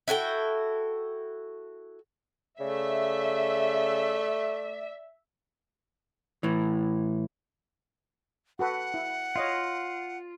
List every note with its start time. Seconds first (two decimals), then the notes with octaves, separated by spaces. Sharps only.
0.08 E4 F#4 A4 G5
2.60 C#3 A3 D5 E5
6.43 A2 E3
8.59 F#4 A4 B4 F#5
8.94 E4
9.36 F4 C#5 D#5 F5